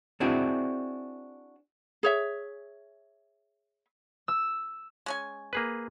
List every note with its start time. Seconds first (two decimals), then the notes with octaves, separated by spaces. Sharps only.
0.20 C4 D4 E4 F#4 G#4
2.03 G#4 C#5 E5
4.28 E6
5.06 G#3 C#4 G#5
5.53 A#3 G#4 B4